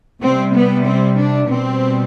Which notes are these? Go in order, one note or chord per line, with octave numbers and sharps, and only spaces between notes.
C3 G3 C4
B3
C4
D4
B2 G3 C4